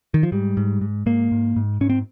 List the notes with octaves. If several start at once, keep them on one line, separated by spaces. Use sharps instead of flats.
D#3
F3
G#2 G3
G#2
G#2
G#2 A#3
G#2
G#2
G#2 C#4
C4